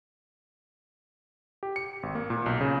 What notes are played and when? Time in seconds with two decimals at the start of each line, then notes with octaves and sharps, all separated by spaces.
1.63 G4
1.76 C#7
2.03 G#1
2.15 A#3
2.30 A#2
2.46 B1
2.61 C#3